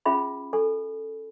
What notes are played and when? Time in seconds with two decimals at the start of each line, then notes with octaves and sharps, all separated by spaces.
0.06 C#4 F4 G#4 E5 B5
0.53 A4 G#5